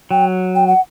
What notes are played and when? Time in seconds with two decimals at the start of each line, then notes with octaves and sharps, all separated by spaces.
0.11 F#3 G5
0.55 G5
0.67 F#5